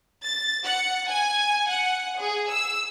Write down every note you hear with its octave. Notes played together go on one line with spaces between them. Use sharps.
A6
F#5
G#5
F#5
G#4
E6